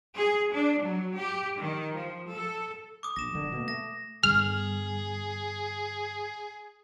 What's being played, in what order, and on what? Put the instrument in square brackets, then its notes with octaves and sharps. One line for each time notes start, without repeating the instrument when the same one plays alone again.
[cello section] G#4
D4
F#3
G4
D#3
F3
A4
[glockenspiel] D6 D#6
[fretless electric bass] A#1 [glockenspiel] A#6 E7
[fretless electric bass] D#1 D3
B2 A#3
[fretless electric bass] A3 [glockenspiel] A#6
[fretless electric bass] G1 [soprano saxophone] G#4 [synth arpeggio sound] F6